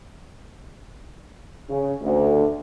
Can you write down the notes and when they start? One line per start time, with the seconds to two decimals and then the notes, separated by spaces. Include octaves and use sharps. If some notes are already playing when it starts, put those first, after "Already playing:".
1.70 C#3
2.02 D2